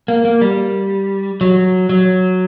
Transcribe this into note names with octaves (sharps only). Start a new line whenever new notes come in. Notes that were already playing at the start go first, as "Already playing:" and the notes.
A#3
A#3
G3
F#3
F#3